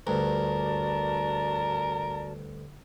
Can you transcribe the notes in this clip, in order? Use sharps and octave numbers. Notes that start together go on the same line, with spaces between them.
D2 G2 F#4 A#4 D5 A5